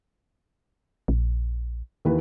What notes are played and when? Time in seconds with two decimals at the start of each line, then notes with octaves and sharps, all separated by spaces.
1.08 A#1
2.05 D#2 E3 B4